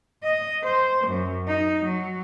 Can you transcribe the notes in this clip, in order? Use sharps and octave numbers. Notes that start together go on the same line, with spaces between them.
D#5
C5
F#2
D#4
F#3